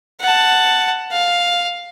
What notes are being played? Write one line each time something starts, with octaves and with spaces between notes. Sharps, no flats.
F#5 A5
F5